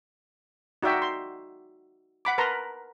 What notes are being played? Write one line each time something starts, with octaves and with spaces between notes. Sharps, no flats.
D#4 F#4 D5 E5 G5
C6
F#5 B5 D6
A#4 B4 A5 A#5 C6